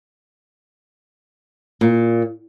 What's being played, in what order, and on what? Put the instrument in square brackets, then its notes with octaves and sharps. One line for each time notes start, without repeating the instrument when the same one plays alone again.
[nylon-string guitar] A#2